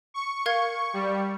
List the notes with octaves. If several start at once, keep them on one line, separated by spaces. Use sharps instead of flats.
C#6
A#4 F5 G#6
G3